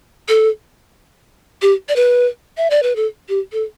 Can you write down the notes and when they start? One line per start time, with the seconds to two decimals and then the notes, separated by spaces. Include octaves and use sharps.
0.29 A4
1.62 G4
1.89 D5
1.96 B4
2.57 E5
2.70 D5
2.83 B4
2.96 A4
3.29 G4
3.53 A4